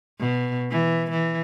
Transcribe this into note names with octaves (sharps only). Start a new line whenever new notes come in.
B2
E3
E3